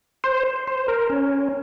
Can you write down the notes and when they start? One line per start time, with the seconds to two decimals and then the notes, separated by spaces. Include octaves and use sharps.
0.24 C5
0.67 C5
0.88 A#4
1.10 C#4